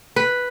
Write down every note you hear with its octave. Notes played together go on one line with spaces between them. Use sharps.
B4